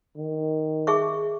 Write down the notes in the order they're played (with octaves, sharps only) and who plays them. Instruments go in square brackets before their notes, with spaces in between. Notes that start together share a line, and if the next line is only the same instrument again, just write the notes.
[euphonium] D#3
[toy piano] G#4 E5 C#6